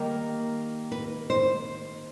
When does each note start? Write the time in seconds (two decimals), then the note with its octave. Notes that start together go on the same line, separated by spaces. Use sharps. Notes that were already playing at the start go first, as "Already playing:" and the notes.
Already playing: D#3 G3 A#3
0.92 B4
1.30 C5